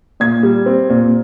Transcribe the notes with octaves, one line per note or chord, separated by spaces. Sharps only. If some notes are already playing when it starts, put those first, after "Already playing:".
A#2 G#6
G3
C4
A#2